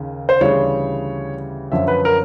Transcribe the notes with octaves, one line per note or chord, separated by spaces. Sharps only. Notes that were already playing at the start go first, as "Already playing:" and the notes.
Already playing: D#2 C#3
C5
D2 C#3 E3 G3 C#5
F#2 D3 F3 E5
B4
A#4